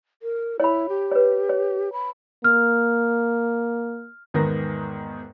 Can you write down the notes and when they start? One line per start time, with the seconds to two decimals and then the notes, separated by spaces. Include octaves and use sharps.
0.22 A#4
0.60 E4 C#5 B5
0.89 G4
1.12 B4 C#5
1.49 C#5
1.93 B5
2.44 A#3 F6
4.34 E2 G#2 D#3 B3 A#4 A#6